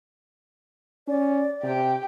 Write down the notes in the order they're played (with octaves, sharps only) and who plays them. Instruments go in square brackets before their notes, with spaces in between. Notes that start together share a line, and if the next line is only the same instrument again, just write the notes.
[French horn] C#4 [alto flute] D5
[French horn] C3 [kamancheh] G4 G5